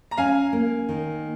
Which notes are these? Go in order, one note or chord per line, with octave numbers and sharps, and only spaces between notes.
A#5
C#4 F5 G#5
A#3
D#3